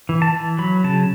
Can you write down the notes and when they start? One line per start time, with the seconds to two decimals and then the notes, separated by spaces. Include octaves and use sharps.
0.09 E3
0.22 A5
0.34 E3
0.58 F#3 B5
0.84 C#3 A5